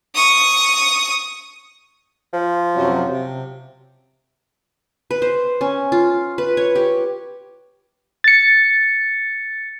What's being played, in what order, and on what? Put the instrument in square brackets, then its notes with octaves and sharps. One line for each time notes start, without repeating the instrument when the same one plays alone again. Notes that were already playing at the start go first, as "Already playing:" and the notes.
[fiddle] C#6 D#6
[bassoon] F3
[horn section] F#2 C3 F#3
C3
[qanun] B4
C5
C#4
F4
B4
C#5
G4
[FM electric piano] A6 C#7